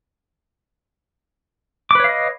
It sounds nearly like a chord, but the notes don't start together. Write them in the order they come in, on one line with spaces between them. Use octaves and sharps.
D6 B4 C#5 F5 D#5